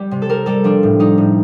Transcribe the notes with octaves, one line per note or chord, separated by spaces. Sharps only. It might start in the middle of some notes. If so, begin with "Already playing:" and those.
Already playing: G3 G4
C3
A4
G3 A#4
G3 A4
F3 D4
A2
G3 D#4
A2